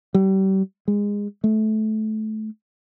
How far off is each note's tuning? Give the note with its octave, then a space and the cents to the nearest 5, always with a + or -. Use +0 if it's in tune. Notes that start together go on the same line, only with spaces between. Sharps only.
G3 -35
G#3 -20
A3 -20